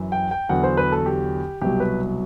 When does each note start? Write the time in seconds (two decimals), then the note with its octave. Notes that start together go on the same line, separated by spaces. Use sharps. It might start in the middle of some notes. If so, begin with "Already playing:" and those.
Already playing: F#2 E3
0.12 G5
0.31 G5
0.49 E2 D3 F#3 F#5
0.64 C5
0.77 B4
0.92 A4
1.06 G4
1.61 C2 B2 F#3 G4
1.80 B4